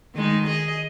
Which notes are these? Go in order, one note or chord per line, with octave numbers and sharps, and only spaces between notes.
D#3 G#3 D#4
G#4 D#5